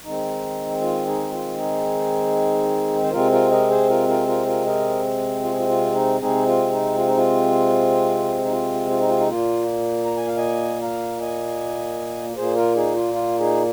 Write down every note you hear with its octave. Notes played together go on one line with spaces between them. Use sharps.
D#3 G#3 C4 D#4
F4
D#4 G#4
F4
D#4 G#4
C5
C3 G#3 C4 F4 A#4
F4 A#4
A#4 D#5
G#4 C5
F4 A#4
F4 A#4
F4 A#4
F4 A#4
A#4 D#5
F4
G#4
F4
F4
D#4
C3 G#3 C4 D#4 G#4
F4
D#4
F4
D#4
F4
D#4
F4
F4
D#4
F4
D#4
A#2 A#3 F4
A#5
G#5
F5
D#5 G#5
F5 A#5
D#5 G#5
A#2 A#3 G#4 C5
F4 A#4
D#4 G#4
F4
F4
D#4 G#4